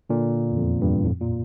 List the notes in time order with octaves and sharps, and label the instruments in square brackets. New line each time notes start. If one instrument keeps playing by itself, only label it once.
[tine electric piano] A#2 D3
E2
F2
E2 G2
F2 A2
A#2